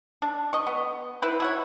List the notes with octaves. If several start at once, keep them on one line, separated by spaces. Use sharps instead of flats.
D4
D#5 C#6
B3
E4 B4 C5
E4 F#4 C#5